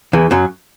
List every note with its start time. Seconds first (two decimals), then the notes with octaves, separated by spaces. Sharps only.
0.13 E2 E3
0.31 F#2 F#3